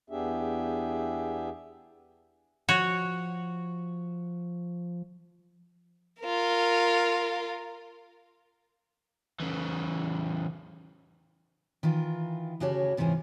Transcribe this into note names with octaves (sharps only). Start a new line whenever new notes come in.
E2 B3 D4 G4 G#4 E5
F3 F#4 C#5
F4 A#4
C#3 E3
D#3 E3 F4
D2 C#3 F#4 G4 C#5 A5
G#2 C3 E3 C#4 F4 G#5